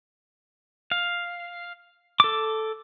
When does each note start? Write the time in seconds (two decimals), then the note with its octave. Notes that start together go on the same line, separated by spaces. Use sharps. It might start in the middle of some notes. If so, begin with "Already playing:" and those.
0.92 F5
2.20 A4 D6